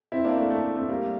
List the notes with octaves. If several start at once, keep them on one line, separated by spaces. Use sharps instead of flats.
C4 E4
A#3 D4
A3
A3
A3 C4
G3 A#3